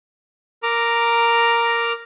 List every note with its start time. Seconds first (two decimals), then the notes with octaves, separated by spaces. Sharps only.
0.63 A#4 A#5 D6